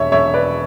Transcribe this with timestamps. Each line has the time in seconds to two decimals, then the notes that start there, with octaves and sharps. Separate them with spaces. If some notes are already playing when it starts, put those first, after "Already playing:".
Already playing: E1 C#5 E5
0.12 E1 C#5 E5
0.34 B4 D5